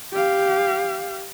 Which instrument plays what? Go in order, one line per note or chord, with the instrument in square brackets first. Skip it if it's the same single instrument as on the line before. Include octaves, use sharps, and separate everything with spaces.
[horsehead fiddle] G4 F5